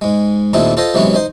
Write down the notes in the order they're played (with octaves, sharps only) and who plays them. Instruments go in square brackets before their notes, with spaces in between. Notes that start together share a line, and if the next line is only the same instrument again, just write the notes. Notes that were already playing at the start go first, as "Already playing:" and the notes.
[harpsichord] G#2 G#3
D#2 A#2 A3 C4 D#4 E4
F4 A4 C5 D#5
C3 E3 F#3 G#3 B3 C#4
D#4 C5